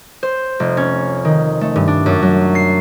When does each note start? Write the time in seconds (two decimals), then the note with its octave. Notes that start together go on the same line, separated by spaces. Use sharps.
0.23 C5
0.60 F1
0.77 C#4
1.25 D#3
1.61 A3
1.76 G2
1.88 D4
2.06 F#2
2.22 F#3
2.55 C7